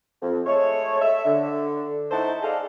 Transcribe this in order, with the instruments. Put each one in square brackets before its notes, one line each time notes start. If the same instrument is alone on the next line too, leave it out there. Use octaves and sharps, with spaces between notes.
[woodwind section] F2
G#3 A3 A4 C#5
E5
D3
A3 D#4 E4 C5 F#5 A5
G#4 A4 D5 D#5 F5 A5